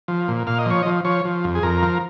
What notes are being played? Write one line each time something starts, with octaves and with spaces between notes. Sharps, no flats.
F3
A#2
A#2 F5
D#5
F3 C#5
D#5
F3
F3 C#5
F3
F2
G#4
F2 A#4
F3